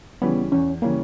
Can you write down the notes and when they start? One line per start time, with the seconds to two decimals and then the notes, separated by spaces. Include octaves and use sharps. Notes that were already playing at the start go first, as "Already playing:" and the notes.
0.22 C#3 E3 G3 B3 C#4
0.52 E2 C#4
0.82 C#3 E3 G3 A#3 C#4